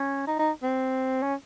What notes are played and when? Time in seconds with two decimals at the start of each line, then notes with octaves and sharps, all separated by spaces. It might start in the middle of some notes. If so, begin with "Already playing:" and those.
Already playing: C#4
0.27 D#4
0.39 D#4
0.63 C4
1.23 C#4